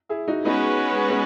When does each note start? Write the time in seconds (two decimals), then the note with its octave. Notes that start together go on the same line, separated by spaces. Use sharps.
0.09 E4 G#4
0.28 D#4 F#4
0.45 G#3 B3 C#4 D#4 F#4 B4
1.09 B3